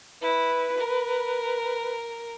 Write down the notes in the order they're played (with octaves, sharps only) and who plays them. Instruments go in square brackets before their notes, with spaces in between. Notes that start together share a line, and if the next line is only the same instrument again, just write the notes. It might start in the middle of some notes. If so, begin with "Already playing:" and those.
[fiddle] E4 [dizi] B4
[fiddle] A#4